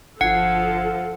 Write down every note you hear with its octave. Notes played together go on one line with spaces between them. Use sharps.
G1 F3 A4 F#5 G#6 C7